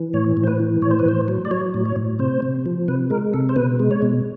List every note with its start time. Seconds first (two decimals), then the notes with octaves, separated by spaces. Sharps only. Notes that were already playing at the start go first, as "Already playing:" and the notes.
Already playing: E3
0.13 A2 C#5
0.37 A2
0.43 C5
0.47 B4
0.60 E3
0.82 A2 C#5
0.91 C5
0.99 B4
1.06 A2 C5
1.28 F#3
1.45 D5
1.51 F#3 C#5
1.74 A2
1.85 C#5
1.96 A2
2.19 C3 C5
2.42 C3
2.66 F3
2.88 C3 B4
3.10 G#3 A#4
3.33 C3 A4
3.49 C5
3.56 B2 B4
3.80 G#3
3.91 C#5
4.02 B2